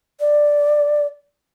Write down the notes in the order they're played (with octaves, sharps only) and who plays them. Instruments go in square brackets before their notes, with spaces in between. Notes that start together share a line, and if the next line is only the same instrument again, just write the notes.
[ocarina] D5